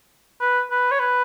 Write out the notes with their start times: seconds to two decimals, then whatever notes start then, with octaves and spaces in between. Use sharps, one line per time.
0.41 B4
0.71 B4
0.91 C#5
0.99 B4